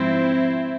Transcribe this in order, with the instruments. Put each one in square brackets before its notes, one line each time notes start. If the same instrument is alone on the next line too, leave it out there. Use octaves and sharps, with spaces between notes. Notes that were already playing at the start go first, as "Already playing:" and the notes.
Already playing: [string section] G#2 F3 C4 E4